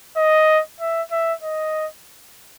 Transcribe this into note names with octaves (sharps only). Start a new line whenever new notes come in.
D#5
E5
E5
D#5